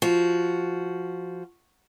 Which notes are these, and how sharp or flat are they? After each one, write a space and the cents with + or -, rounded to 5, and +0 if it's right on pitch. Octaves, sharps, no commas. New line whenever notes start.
F3 -5 F#4 +0